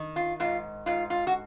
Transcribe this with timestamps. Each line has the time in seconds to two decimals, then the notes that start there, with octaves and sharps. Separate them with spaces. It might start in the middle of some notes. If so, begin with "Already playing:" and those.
Already playing: D#3
0.16 F4
0.40 G#2 F4
0.86 G#2 F4
1.10 F4
1.27 F#4